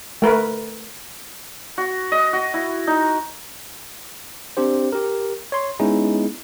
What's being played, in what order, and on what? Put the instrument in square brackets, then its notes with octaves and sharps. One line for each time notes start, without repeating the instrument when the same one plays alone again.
[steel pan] A3 A#4 B4
[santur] F#4
D#5
F#4
E4
D#4
[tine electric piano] C4 D4 G4 C5
G4 A#4
C#5 C6
G#3 B3 C#4 D#4 E4 G#4